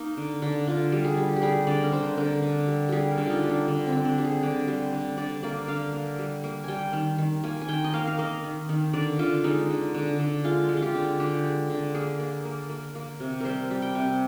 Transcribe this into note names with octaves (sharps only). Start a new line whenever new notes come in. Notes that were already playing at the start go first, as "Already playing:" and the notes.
Already playing: A#3 D#4
D3
D3
D3 F4
G3
G#4
G3
G4
G3 G#4
D3 D5
A#4
D3 C5
D3 A#4
D3
G3
G3 G4 G#4
A#4
D3
D#4 F4
G3
D4
D3 D4
C4
D3
D4
G3
G#4
D3 D5
G3 C5
D3
D3 D5
A#3 D5
D3 F5
A#3
G3
A#3
G3 G5 G#5
D#3
D#3
A#3 G#5
G#5
D#3 G5
D#5
A#3 F5
F5
A#3 D#5
D#3
D#3
D3 D5
D3 F4
G#3 D#4
D3
D3
D3
G#3 F4
G#3
F4
G4
D3
D3 G4
G#3
D3
A#3 G#4
A#3
A#3
A#3
A#3
C3
G3 A#4 C5
G3
G5
C3